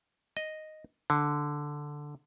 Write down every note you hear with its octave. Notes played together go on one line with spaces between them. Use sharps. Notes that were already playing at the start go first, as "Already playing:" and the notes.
D#5
D3